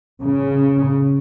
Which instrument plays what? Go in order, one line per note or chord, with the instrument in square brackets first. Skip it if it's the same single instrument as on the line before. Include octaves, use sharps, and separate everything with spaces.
[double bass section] C#3